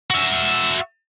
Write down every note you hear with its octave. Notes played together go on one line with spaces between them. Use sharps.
F#4 E5